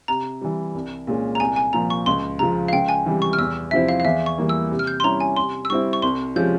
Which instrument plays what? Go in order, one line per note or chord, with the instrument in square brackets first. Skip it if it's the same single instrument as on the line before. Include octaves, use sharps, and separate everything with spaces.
[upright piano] C3 [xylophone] A#5
[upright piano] E3 G3
C2
A#2 G#3 C#4
[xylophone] A#5
[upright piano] C2 [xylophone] G#5
[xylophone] G#5
[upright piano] A#2 F3 [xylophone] A#5
[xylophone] C#6
[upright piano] C#2 [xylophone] C6
[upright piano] C#3 F3 [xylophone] A#5
[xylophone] F5
[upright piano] C#2 [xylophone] G5
[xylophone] G#5
[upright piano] C3 E3 G3
[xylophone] C#6
F6
[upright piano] E2 [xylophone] E6
[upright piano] C3 F3 C4 E4 [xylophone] E5
[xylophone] F5
F5
[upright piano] E2 [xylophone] E5
[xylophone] C#6
[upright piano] E3 G3 A#3 E4
[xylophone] E6
[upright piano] C3
[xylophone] F6
G6
C6
[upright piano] G3 C#4 E4 [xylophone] A#5
[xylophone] G#5
[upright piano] C3 [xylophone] C6
[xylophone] E6
[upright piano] G3 C4 E4 [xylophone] C#6
[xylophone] C#6
[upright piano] C2 [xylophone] C6
[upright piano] C3 F3 G#3 C#4 [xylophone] G6